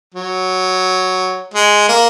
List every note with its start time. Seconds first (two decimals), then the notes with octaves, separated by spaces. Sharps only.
0.15 F#3
1.54 G#3
1.89 A#3